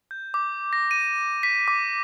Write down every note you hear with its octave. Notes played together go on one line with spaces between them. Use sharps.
G6
D6
A#6
D#7
B6
D6